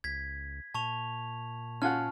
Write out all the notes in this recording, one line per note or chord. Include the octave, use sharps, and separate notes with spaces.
C#2 G#6 B6
A#2 A5 C#6 F7
C#4 F4 F#5 A5 F6